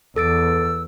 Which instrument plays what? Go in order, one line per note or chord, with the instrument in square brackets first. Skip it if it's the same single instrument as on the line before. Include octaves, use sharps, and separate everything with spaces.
[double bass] E2 [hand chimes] A4 A6 D7 [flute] E6